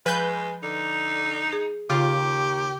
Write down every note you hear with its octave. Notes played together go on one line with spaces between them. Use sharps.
F3 G#3 B4 G6
D3 D#4
G#4
D#2 C#3 F4 G4